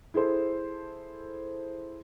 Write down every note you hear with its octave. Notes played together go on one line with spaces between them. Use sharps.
E4 G#4 A4 C5